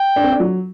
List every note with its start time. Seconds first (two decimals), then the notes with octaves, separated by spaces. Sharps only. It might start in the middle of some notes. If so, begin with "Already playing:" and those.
Already playing: G5
0.16 D4
0.24 C4
0.32 D4
0.40 F#3